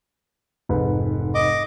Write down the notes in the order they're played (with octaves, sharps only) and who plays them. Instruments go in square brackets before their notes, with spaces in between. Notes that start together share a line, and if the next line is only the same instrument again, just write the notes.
[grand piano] F1 G#2 B4
[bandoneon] D#5 D6